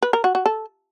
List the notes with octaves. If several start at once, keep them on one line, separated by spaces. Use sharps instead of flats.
B4
A#4
F#4
F#4
A4